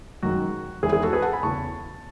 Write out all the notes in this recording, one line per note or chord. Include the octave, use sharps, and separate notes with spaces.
F#2 D#3 G#3 F#4
E2 D#3 G#3 E4 G#4
E4 G#4
F#4 A4
G#4 B4
F#5 A5
G#5 B5
E2 C#3 E3 A5 C#6